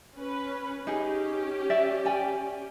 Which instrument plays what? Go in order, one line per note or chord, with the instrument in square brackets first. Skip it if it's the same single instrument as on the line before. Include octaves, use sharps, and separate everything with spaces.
[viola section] C#4 B4
[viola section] C#4 G4 [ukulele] D#4 G#4
[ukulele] D5 E5 G5
D5 G5 G#5